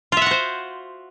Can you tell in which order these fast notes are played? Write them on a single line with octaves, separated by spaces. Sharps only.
F4 E5 F#5 F#4 C5